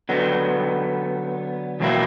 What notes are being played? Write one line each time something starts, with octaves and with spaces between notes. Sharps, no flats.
D3 F#3 B3
E2 B2 F#3 A#3 E4